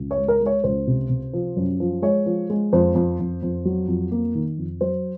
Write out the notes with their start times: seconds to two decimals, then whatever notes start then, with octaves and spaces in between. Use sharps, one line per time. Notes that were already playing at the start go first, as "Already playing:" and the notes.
Already playing: C#2
0.11 C#5
0.17 G#3
0.28 A#4
0.40 G#3
0.46 C#5
0.64 C#2 C5
0.87 C3
1.10 C3
1.33 F3
1.56 F#2
1.80 F3
2.02 G#3 C#5
2.26 F3
2.50 G#3
2.73 F2 C5
2.95 F2
3.19 F2
3.42 F2
3.65 F#3
3.88 F2
4.12 A#3
4.35 D#3
4.58 F2
4.81 F#3 C5